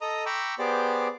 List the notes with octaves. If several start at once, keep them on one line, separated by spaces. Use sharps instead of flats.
A4 D#5 A#5 D#6
G5 A#5 B5 C#6 D6 E6
B3 G4 G#4 C5 D5 D6